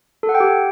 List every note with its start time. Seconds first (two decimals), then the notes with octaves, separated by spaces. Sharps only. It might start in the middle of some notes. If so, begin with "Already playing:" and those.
0.23 A4
0.29 F#5
0.35 G5
0.40 G4